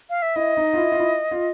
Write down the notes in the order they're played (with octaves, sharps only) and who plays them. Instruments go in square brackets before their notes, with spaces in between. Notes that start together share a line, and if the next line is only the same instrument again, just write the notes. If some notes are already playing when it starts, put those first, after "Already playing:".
[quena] F5
E5
[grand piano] E4 [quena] D#5
[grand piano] D#4
F4
E4
F4
E4
F4